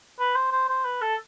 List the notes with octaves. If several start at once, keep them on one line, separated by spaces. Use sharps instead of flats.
B4
C5
C5
C5
B4
A4